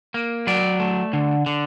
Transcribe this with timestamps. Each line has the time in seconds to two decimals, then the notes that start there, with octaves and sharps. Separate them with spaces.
0.14 A#3
0.47 F#3 D5
0.80 A3
1.13 D3
1.46 D3